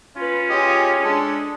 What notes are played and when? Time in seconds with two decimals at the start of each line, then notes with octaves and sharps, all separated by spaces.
0.17 C#4 F4 B4
0.50 F4 G4 G#4 C#5 D#5 G#5
1.04 G#3 D4 A4